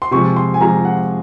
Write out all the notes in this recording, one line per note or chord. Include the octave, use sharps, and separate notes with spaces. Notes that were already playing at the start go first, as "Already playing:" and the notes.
C6
C3 F3 G#3 C#6
C6
G#5
C3 F3 G#3 A#5
F#5